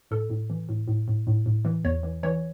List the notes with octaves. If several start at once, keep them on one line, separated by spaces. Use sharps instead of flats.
A2 A4
A2
E3
A2
A2
A2
A2
A2
E3
E2 C#5
E3
E3 C#5